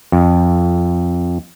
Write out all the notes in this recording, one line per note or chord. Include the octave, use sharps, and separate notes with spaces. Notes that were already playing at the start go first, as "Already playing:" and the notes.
F2